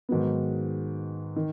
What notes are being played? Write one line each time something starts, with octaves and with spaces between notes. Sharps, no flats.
G#2 D#3 F#3 B3
D#3